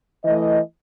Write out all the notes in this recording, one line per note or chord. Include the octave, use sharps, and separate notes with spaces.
E3 A3 D#5